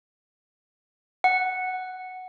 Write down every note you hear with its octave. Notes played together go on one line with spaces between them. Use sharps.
F#5